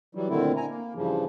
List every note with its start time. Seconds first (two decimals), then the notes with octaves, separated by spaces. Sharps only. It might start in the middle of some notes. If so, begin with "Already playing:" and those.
0.15 E3 F#3 G3
0.29 A#2 D3 D#3 A3 C4 E4
0.57 D3 G#5 A#5
0.69 A#3
0.95 G2 C#3 E3 F3